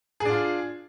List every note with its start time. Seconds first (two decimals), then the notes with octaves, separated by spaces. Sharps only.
0.20 G#4
0.25 D4
0.30 F4